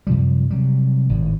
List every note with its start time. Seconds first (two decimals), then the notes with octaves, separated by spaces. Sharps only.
0.07 F#2 C3 F3 G3
0.50 C3 F#3 G3
1.09 G#1 A2